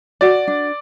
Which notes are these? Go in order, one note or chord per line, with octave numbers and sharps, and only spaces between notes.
F#4 D5
D4